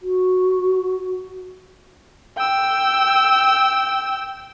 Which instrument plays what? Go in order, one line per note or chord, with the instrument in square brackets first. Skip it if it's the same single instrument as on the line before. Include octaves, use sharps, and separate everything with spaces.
[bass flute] F#4
[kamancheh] G5 E6